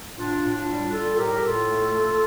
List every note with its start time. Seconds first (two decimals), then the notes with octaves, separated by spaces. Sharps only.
0.17 A2 D4 F4
0.42 A2
0.54 D4 F4
0.66 G3
0.92 G3 F4 A4
1.17 A2 G4 A#4
1.37 G4
1.42 A2 F4 A4
1.67 A3
1.92 A3